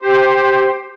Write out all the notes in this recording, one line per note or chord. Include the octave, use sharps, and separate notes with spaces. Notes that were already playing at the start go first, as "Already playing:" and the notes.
G4 C5